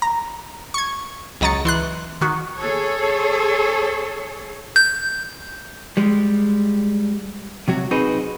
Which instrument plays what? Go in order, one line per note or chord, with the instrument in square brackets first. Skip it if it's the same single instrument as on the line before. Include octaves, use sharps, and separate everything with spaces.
[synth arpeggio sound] A#5
C#6 G#6
C#2 F#3 D#5 A#5 A6 C#7
E3 C6 F#6
D#3 F#4
[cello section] G#4 A4 C#5
[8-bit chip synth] G6
[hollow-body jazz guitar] G3 G#3
C3 F#3 F#4
C4 D#4 F#4 G#4 B4